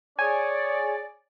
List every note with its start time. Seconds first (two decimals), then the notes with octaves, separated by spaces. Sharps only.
0.19 G#4 C#5 D5 G#5